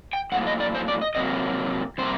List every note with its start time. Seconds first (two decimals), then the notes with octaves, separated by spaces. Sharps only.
0.13 G5
0.32 A2 F#3 A#3 F#5
0.47 D#5
0.60 D5
0.75 C5
0.88 D5
1.02 D#5
1.15 C3 F#3 A#3 D#5
1.98 C3 G3 A#3 C5